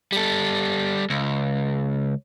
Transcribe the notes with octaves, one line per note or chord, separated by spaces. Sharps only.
G3 A4
C#2